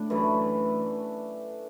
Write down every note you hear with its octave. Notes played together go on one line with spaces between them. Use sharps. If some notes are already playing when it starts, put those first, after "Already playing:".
Already playing: A2 D4
F#2 E3 A3